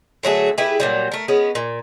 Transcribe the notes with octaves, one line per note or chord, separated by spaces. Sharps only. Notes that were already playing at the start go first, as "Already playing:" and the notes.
D3 F#3 A3 G#4
E4 G4 G#4 B4
A#2 F#3 G3
A3 A#4
G#3 B3 C#4
A#2